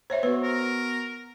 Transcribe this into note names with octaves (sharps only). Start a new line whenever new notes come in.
C5 C#5 E5
B3 F#4 B4
A#4